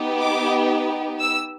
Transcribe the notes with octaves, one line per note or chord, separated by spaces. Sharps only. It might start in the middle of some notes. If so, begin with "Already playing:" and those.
Already playing: B3 D#4 G4
D6
E6